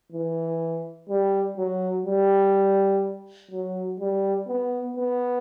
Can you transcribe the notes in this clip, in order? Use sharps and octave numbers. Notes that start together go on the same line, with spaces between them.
E3
G3
F#3
G3
F#3
G3
B3
B3